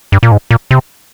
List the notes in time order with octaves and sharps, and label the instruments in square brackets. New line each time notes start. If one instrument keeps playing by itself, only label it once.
[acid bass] G2
A#2
G#2
A#2
C3